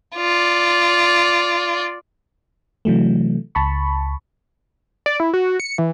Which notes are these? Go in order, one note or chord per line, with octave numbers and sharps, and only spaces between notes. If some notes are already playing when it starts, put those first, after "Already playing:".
F4 D5
C3 E3 F#3 A3
C#2 A5 B5 C#6
D5
E4
F#4
C#7
E3